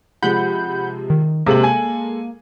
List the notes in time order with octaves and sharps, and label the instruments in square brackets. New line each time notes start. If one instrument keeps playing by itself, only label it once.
[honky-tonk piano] C3 F3 G#3 [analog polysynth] F#5 B5 G6
[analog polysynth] D#3
[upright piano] C3 [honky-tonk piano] G#3 A4 F#7 [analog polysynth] A#3
[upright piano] G#5